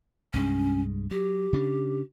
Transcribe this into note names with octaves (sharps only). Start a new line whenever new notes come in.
C2 G2 G#3 C#4
F#3 G4
C#3 C#4 D4